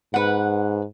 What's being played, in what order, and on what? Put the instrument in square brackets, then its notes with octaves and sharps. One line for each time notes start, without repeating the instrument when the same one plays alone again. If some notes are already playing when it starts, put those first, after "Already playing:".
[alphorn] G#2 [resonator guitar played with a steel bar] B4 F#5